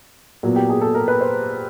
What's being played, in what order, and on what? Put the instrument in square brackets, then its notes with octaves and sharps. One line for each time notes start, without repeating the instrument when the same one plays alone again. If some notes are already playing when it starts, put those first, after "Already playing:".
[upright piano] A#2 F#3 B3
G4
G#4
A4
A#4
B4
C5